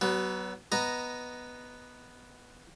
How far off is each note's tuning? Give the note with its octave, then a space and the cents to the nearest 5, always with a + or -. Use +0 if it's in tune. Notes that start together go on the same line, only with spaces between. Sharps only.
F#3 +35 B3 +0
B3 +0 D#5 +0 A#5 +0